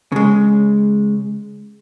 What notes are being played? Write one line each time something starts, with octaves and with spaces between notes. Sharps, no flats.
C#3 G#3